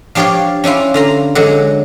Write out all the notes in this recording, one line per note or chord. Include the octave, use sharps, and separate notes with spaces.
F3 D4 G4 C#5 D5 F5
C#4 D4 E4 F4
D3 F4 A#5
D3 F#3 G#3